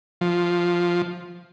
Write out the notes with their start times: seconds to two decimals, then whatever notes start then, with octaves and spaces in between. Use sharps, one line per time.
0.21 F3